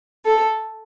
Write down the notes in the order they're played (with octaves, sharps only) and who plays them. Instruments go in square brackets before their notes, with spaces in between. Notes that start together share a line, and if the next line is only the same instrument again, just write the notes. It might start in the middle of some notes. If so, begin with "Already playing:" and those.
[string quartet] A4